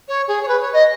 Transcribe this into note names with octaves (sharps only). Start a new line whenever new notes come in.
C#5
G#4
C#5
B4
C#5
D#5